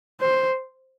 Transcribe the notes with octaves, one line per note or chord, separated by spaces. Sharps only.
C5